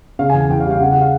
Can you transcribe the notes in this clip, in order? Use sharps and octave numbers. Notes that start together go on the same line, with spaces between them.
C#3 F5
G#5
E2
G#5
E3 G5
F5
G3
F5
C#3 F#5
F#5
F5